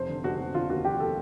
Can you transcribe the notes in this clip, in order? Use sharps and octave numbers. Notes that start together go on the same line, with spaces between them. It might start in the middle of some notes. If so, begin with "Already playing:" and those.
Already playing: F1 C5
D3
F1 F#4
F1
D3 F4
D#2 F#4
F1 G4
A4